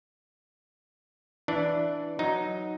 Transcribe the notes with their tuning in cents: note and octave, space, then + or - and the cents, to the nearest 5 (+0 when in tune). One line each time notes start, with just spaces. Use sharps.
E3 +0 D4 +0
F#3 +0 D#4 +0